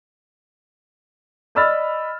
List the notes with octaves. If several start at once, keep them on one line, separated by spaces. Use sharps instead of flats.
D5 D#5 B5 E6 F6 A6